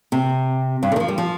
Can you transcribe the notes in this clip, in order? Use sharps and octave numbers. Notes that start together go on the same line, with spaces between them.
C3
G2
D3
D#3
F3
G3
F3